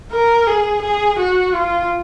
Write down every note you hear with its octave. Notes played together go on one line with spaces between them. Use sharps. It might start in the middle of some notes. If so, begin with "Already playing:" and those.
A#4
G#4
G#4
F#4
F4